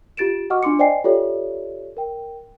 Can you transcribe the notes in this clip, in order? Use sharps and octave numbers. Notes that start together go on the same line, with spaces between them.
F4 G4 A6 D7 E7
F#4 D#5 F#5 C#6 D6 F6
D4 F4 C6 D6 C#7
C5 D5 D#5 G5 G#5 C7
F4 G4 A4 C#5 D5 E5
A#4 G5